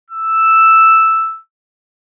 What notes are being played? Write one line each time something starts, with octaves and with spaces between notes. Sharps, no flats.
E6